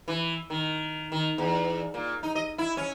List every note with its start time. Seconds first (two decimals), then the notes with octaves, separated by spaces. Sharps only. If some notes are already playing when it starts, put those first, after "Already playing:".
0.08 E3
0.50 D#3
1.12 D#3
1.38 E2
1.94 A#2
2.23 D#4
2.35 D#5
2.58 E4
2.77 C#4